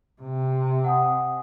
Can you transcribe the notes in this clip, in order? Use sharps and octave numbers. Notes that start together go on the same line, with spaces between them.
C3
F#5 G#5 D#6